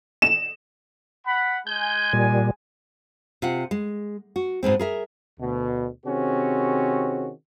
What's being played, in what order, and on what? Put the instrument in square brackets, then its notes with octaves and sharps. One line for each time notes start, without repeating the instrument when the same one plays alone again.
[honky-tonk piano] E7
[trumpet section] F#5 B5
[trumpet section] G#3 G#5 [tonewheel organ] G6
[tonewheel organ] A#2 G3
[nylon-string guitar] C3 F4 F#5
G#3
F#4
G#2 B2 G#3 C4
G#4 A#4 E5
[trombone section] D2 B2
C3 D#3 C4 C#4 F#4 G#4